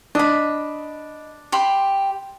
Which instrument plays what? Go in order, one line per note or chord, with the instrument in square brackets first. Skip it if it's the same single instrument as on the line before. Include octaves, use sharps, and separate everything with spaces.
[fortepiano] D4 [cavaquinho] D#5 B5
[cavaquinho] G4 B5 C6